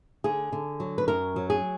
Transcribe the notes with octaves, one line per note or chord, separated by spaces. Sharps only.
D3 G#4
D3
F#3
B4
F#2 A#4
F#3
G#4